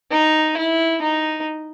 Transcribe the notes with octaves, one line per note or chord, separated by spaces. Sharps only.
D#4
E4
D#4